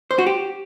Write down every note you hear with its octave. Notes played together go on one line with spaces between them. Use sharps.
C5
F#4
G4